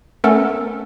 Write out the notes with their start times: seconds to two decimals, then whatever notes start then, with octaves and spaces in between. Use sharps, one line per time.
0.24 A3 B3 C#4 A4 A#4